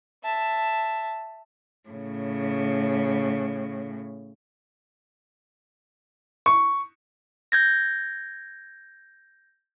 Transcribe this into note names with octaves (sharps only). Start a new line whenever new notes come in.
E5 A5
A2 C#3
C#6
G6 G#6 A#6